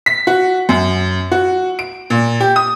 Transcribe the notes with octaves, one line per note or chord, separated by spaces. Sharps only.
B6
F#4
F#2
F#4
D7
A#2
G4
D#6